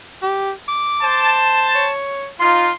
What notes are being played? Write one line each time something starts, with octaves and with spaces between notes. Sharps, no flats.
G4
D6
C5 A5
C#5
D#4 F4 C6